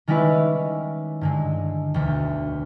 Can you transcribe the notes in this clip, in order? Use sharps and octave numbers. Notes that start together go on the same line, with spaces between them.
D#3 G3 G#3 C#4 E4 B4
G2 D3 G#3
E1 D2